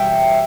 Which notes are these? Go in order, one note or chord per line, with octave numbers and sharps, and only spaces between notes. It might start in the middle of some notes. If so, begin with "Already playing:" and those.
Already playing: E2 B2 G3 E5 G5